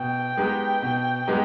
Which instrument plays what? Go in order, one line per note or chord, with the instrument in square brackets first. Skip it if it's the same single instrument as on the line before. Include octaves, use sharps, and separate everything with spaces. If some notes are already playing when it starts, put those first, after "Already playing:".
Already playing: [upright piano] B2 [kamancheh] G5
[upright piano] G#3 B3 D#4 G4
B2
G#3 B3 D#4 G4